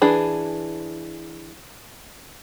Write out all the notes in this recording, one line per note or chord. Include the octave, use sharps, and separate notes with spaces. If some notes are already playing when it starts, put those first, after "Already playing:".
E3 D4 G#4 B5